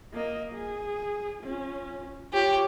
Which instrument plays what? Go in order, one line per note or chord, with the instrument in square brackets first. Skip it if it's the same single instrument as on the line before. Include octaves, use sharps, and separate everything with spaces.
[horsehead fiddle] A#3 D#5
G#4
C#4 F4
[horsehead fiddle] F4 C#5 [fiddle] G4